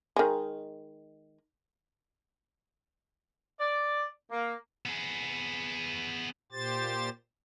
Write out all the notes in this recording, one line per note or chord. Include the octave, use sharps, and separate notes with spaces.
D#3 G#3
D5
A#3
B3 G#4
A#2 G4 C5 A6